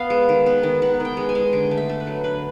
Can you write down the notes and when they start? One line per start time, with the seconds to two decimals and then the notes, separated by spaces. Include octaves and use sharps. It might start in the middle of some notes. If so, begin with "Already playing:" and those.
Already playing: B3 F5
0.10 G#3
0.29 D#3
0.46 B3
0.63 D#3
0.82 B3 F#5
1.00 D#3 G5
1.17 G#3
1.29 G#5
1.35 G#3
1.53 D3 G5
1.71 A3
1.77 E5
1.89 A3
2.00 B4
2.07 F#3
2.24 D3 B4